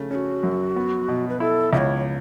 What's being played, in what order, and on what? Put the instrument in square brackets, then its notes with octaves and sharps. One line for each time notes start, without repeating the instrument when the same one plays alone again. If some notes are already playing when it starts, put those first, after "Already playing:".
Already playing: [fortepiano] C#3 A3
[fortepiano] C#4 [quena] A4
[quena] F#4
[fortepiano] F#2
B3
B2
[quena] B4
[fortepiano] E4 [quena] A4
[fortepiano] C#2 [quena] E5
[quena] C#5